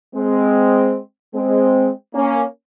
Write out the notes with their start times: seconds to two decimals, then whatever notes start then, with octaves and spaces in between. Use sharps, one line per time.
0.15 G#3 C4
1.34 G#3 C4
2.14 A#3 C#4